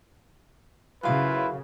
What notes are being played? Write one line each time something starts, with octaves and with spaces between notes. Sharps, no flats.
F#2 C#3 E4 F4 B4 F5